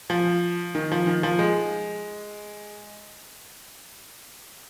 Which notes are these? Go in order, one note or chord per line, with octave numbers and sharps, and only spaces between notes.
F3
D#3
F3
D#3
F3
G#3